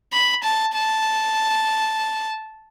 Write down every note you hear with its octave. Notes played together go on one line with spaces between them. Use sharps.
B5
A5
A5